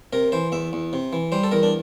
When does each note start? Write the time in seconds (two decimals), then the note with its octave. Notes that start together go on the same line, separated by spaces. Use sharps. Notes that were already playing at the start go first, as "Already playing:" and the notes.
0.13 C3 A#4
0.32 E3 C5
0.52 E2 E5
0.73 E2
0.93 C3
1.13 E3
1.32 G3 C5
1.44 A4
1.51 E2 A#4
1.63 D4